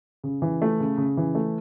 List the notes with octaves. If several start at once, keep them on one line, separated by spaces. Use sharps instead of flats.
C#3
E3
A3
C#3
C#3
E3
A3